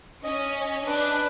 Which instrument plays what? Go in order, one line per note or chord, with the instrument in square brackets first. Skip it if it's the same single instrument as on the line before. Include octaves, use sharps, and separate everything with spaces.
[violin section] C#4 [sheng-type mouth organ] D#5
[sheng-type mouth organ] D#5
[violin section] D4 [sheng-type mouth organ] B4